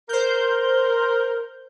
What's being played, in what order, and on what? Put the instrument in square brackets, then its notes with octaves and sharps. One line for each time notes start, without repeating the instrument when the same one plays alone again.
[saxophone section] A#4 [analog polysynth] C5 G6